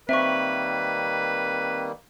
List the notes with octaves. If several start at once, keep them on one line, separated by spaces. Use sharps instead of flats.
D#3 G3 A#3 C4 B4 E5 C#6